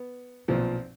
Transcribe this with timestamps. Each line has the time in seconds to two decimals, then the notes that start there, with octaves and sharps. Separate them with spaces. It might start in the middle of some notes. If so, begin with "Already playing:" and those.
Already playing: B3
0.48 B1 A#2 F3 C4